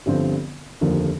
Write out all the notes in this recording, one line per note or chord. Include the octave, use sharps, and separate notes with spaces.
G1 G2 D3 F3 C4
F1 D#2 D3 F3 A#3